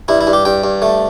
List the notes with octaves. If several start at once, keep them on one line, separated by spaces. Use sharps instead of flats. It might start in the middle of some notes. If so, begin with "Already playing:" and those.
G2 E4
E4
G2
G4
G2 G5
G2
A3